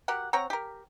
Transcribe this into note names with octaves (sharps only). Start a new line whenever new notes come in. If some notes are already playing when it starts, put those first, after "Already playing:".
F#4 G4 A#4 F#5
C4 C#5 F#5 A#5
G4 A#4